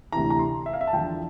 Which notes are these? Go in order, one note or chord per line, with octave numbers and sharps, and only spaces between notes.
D2 C3 E3 A#5
A#5
C6
E5
F5
E5
A5
E2 D3 F3 G5